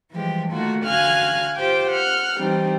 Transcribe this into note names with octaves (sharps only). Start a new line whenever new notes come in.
E3 F3 G3 G#3 G4
D#3 A3 A#3 F4 F#4
D3 F#4 F5 G#5 F6 F#6
F4 G4 C5 G5 D6
F#5 F6 G6
E3 G3 C4 D#4